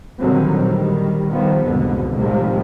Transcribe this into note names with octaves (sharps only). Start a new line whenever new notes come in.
A#2 D3 D#3 F#3 G3 C4
D#3 G3
D#3 F3 G3 B3
C2 F2 G#2 B2 D3
A2 C3 D#3 F3 G3 G#3